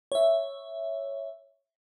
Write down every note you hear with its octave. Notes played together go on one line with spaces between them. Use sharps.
C#5 E5